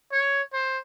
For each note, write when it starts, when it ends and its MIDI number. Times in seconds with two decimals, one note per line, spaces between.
0.12 0.41 73
0.53 0.79 72